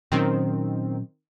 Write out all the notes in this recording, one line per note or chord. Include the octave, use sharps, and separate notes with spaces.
A#2 D#3 F#3 C4 C#4